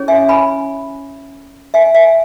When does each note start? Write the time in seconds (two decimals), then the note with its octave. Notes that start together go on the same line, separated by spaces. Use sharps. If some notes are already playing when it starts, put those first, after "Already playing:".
Already playing: C#4 E4 G#4 C#5
0.08 E5 G#5
0.28 G#5 B5
1.74 E5 G#5
1.95 E5 G#5